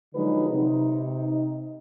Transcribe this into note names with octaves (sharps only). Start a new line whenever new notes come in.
D3 F3 F#3 G#3 D#4 B4
C3 D#4